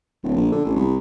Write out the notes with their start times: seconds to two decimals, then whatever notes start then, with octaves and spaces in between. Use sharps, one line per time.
0.23 D1
0.36 A#1
0.52 D3
0.65 A1
0.76 C2